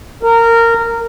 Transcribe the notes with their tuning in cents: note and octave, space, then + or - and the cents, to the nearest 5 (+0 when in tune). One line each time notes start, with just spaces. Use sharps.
A#4 -15